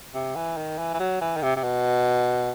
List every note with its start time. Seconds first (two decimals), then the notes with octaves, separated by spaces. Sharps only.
0.14 C3
0.35 E3
0.57 D#3
0.79 E3
0.94 E3
1.00 F#3
1.21 E3
1.37 D#3
1.42 C3
1.56 C3
1.64 B2